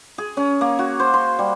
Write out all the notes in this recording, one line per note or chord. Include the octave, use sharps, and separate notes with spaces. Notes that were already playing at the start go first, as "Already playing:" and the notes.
G#4
C#4
A#3
F#4
C5
C6
G3